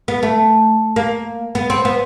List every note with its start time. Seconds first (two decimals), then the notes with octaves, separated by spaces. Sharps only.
0.08 B3
0.23 A3
0.96 A#3
1.55 B3
1.70 C4
1.85 B3